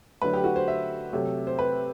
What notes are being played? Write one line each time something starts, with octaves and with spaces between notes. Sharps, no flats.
D3 F#3 A3 B4
G4
F#4
C5
E5
C3 F#3 A3
C5
B4